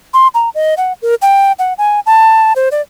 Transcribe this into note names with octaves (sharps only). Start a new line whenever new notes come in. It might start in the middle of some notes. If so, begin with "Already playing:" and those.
C6
A#5
D#5
F#5
A#4
G5
F#5
G#5
A5
C5
D5